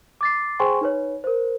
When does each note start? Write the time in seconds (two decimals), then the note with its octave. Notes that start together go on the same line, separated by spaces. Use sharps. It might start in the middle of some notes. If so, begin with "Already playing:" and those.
0.21 D6 A6 C7
0.59 G#4 C5 G5 G#5 C6 C#6
0.81 D#4 B4 C#5
1.24 A#4 C5